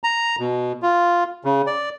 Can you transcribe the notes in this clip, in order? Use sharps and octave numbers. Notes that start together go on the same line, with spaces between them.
A#5
B2
F4
C#3
D5